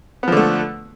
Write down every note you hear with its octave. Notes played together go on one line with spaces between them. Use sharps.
D3 F3 A3 B3